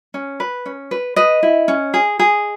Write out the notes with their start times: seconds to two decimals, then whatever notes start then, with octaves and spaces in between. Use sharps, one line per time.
0.14 C#4
0.40 B4
0.66 C#4
0.91 B4
1.16 B4 D#5
1.43 E4
1.68 C#4
1.94 G#4
2.19 G#4